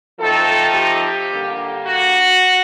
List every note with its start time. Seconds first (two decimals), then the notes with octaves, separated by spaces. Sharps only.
0.20 F3 A3 C4 D#4 A4
0.75 G4
1.30 D3 G3 A#3
1.86 F#4